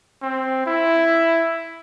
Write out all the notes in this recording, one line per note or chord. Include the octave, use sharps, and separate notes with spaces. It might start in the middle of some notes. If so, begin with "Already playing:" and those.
C4
E4